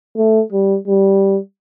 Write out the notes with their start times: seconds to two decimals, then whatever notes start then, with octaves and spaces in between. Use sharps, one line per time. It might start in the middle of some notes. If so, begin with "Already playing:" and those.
0.17 A3
0.52 G3
0.88 G3